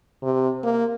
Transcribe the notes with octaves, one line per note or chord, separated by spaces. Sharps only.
C3
A#3